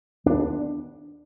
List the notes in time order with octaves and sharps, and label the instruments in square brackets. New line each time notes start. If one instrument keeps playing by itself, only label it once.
[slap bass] D#2 B3 D4